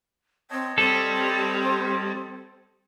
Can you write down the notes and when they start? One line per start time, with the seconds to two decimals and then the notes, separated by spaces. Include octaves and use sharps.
0.51 C4 C#5 D#5 A5
0.78 G3 C4 A4